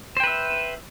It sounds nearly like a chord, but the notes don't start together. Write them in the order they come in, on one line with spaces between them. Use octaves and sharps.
C5 G5 B4 E5